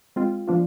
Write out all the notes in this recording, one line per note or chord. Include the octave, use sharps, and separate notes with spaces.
G#3 C4 F4
F3 B3 D4 F4